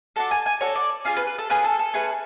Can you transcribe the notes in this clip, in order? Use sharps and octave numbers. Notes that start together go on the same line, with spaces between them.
D4 F#4 A4 A5
G#5
G#5
D4 F#4 A4 C#5
D5
C#4 F4 G#4 F5
B4
B4
A4
C#4 F4 G#4 B4
A4
A4
A3 C#4 G#4 B4